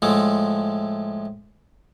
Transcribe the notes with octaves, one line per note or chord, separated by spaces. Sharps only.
A2 F3 G#3 A3